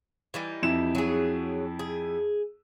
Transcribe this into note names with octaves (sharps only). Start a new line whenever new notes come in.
E3 G3 D#4
F2 E4 E7
F#3 G#4
G#4